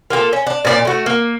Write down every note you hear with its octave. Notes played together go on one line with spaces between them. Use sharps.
A#3 F4 G4 A4
C#4
D4
A#2 C#4 E4 D5
A3 F#4
A#3